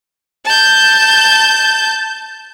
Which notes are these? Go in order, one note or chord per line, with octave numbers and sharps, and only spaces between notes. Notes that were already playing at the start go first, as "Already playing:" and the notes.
A5 G6